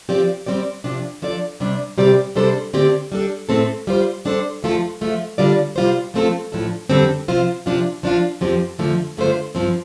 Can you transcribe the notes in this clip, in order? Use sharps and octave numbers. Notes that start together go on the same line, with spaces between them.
F3 C4 G4 D5
G3 C4 G4 D5
C3 F3 D4
F3 D4 A4 D5
C3 G3 D4
C3 G3 C4 G4 D5
C3 G3 D4 A4 C5
D3 A3 C4 G4 D5
G3 D4 A4
A2 A3 C4 A4
G3 F4 C5
G3 D4 A4 C5
F2 F3 A3 F4 A4
F3 A3 F4
D3 G3 F4 D5
C3 G3 F4 C5
F3 A3 C4 F4 A4
A2 F3 D4 A4
F2 D3 G3 C4 A4
C3 F3 C4 F4 C5
C3 F3 D4 F4
F3 D4 F4
F2 F3 C4 G4
F2 D3 F3 A3
G2 D3 A3 F4 C5
G2 F3 C4